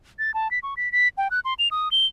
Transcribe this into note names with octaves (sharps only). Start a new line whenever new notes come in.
A6
A5
B6
C#6
B6
B6
G5
F#6
C6
F7
D#6
G7